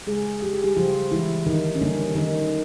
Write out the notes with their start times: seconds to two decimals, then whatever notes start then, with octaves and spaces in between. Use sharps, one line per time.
0.07 C#3 G#3 G#4
0.42 F3 G#3 G4
0.54 G#4
0.64 G3 G4
0.76 C#3 F3 F4
1.11 E3 F3 G#3 E4
1.46 D3 D#3 D#4
1.75 C#4
1.81 D3 G3 A#3 D4
2.15 D3 D#3 D#4